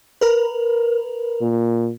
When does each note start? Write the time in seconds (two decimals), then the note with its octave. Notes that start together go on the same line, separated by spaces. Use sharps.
0.21 A#4 B4
1.41 A#2